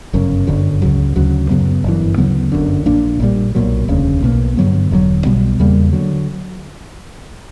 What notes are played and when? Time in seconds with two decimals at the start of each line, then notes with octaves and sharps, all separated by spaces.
0.13 G1 F#2 C#3
0.47 G1 F#2 D3 F#3
0.82 C#2 C#3 F#3
1.16 D2 C#3 F#3
1.50 F#2 C#3 F#3 B3
1.84 G1 F#2 E3
2.18 D2 C#3 F#3 B3
2.52 G1 F#2 D3
2.86 A#1 A#2 A#3 D4
3.20 A#1 A#2 G3
3.55 B1 A#2 F#3
3.88 E1 D2 C#3
4.22 B1 B2 A#3
4.57 G2 D3 F#3 B3
4.91 E1 D2 D3 F#3
5.25 B1 B2 G3 B3
5.60 E2 C#3 G3 A#3
5.93 D3 F#3